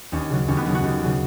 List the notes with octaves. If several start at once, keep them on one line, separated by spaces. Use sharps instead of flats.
D#2 C#4
C#3 F#3
D#2 C#4
B3
C#3 F#3 C#4
F#4
D#2
C#3 F#3